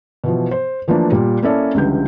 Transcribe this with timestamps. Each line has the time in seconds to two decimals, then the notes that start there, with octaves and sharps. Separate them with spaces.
0.24 B2 E3 F3
0.51 C5
0.88 E3 F3 A3 A#3 D4
1.12 A#2 G3
1.42 A#3 C#4 E4 A4 D5
1.74 C#2 D3 E3 G3 C#4 G6